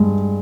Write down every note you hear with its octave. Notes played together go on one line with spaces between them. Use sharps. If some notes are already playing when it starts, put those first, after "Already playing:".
Already playing: G2 G#3